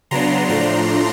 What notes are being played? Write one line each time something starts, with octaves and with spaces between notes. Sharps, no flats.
C#3 F#3 B3 D4 A#5 C6
A2 F3 A3 D4 A#5 C6